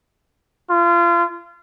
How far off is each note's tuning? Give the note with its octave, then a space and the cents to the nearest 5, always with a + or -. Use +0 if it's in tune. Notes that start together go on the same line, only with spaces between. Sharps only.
F4 -30